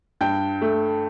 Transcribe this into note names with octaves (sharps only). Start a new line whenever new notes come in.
G2 G5 G6
A3